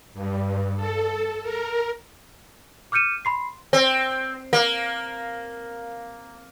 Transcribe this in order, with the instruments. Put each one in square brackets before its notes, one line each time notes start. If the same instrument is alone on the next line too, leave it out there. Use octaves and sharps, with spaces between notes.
[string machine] G2
A4
A#4
[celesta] D6 F6 G6 C#7 D#7 E7
B5 C6 C7
[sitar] C4
A#3